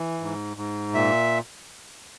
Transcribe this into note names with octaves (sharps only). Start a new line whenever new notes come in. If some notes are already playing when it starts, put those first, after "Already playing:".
Already playing: E3
G#2
G#2
A#2 E5